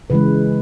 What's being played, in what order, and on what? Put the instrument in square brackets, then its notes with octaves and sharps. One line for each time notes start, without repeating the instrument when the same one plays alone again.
[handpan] C#3 E3 G#3 B4